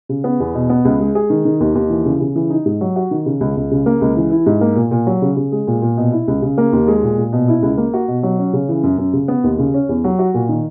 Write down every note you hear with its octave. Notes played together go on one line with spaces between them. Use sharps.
C#3
B3
E2
B2
B3
C#2
G#3
G#4
D#3
D#3
D#2
D#2
E3
C#3
C#3
E3
D#4
G#2
F#3
F#4
D#3
C#3
C#2
C#2
C#3
A#3
C#2
E3
E4
G#2
A#3
A#2
A#2
F#3
C#3
C#3
G#3
A#2
A#2
B2
E4
C#2
C#3
A#3
D#2
G#3
A#2
A#2
B2
E4
C#2
A#3
F#4
B2
F#3
C#4
C#3
E3
F#2
F#2
C#3
B3
D#2
C#3
C#4
E2
F#3
F#4
A#2
D#3